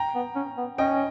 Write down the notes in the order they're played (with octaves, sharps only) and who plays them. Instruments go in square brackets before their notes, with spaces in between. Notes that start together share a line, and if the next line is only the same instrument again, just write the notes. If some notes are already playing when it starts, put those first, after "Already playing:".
Already playing: [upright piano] G5 A#5
[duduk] B3
C#4
B3
[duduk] C#4 [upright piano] D#5 G5